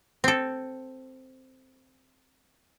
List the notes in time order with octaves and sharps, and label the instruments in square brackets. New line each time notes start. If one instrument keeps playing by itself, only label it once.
[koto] C4 A4